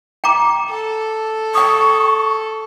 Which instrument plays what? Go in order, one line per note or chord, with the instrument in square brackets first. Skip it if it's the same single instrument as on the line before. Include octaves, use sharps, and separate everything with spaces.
[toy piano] G5 A#5 D6
[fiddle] A4
[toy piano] G5 D#6 [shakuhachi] C#6